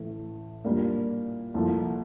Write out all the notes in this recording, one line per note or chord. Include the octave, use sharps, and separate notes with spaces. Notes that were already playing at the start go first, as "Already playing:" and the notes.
Already playing: A1 A2 A3
A#2 G3 A#3 D4
C2 A#2 F3 A3